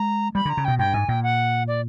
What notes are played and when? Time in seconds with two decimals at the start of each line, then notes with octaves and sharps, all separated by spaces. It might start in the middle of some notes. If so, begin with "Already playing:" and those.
Already playing: G#3 A#5
0.35 G3 B5
0.45 D3 A#5
0.57 C#3
0.65 B2 G5
0.79 G2 G5
0.94 G#2 G#5
1.09 A#2 G5
1.23 F#5
1.68 D5